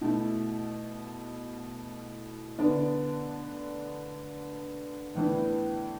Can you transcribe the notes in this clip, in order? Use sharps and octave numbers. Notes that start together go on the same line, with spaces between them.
B2 A3 E4
D3 B3 D4
A2 E3 B3 D4